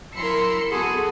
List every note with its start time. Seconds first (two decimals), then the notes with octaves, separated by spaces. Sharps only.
0.15 F#3 E4 A#4 C6 E6 C#7
0.70 B3 F#4 G#4 A4